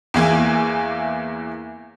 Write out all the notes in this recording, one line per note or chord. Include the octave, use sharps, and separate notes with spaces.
E2 E3 A#3 G#5